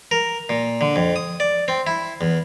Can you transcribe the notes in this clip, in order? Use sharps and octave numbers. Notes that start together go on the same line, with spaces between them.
A#4
A#2
D3
F2
D#6
D5
C4
E4
E2